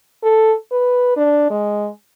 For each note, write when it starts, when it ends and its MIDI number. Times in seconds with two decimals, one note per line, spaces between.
0.23 0.52 69
0.71 1.14 71
1.16 1.50 62
1.50 1.88 56